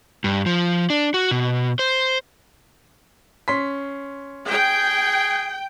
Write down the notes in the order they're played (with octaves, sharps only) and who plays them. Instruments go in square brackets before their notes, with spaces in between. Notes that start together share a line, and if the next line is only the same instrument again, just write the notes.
[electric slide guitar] G2
F3
D4
F#4
B2
C5
[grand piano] C#4 C6 B6
[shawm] G#4 [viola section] G5